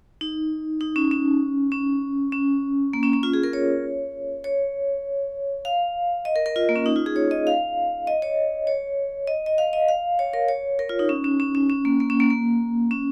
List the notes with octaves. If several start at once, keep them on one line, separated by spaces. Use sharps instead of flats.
D#4
D#4
C#4
C#4
C#4
C#4
A#3
C#4
C#4
F4
G#4
A#4
C#5
C#5
F5
D#5
A#4
A#4
F4
A#3
C#4
D#4
F4
G#4
C#5
D#5
F5
D#5
C#5
C#5
D#5
D#5
F5
D#5
F5
C#5
A#4
C#5
A#4
F4
D#4
C#4
C#4
C#4
C#4
C#4
A#3
A#3
C#4
A#3
A#3
C#4